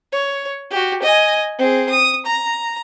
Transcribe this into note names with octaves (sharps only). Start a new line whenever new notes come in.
C#5
F#4 G4
D#5 G#5
C4 G#4
D#6
A#5